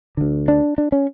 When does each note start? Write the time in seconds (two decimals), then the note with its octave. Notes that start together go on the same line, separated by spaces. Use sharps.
0.17 D2 D3
0.48 D4
0.78 D4
0.92 C#4